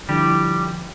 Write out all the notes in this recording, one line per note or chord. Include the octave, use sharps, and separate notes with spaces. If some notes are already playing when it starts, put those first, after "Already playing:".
D3 F3 G3 E4 G4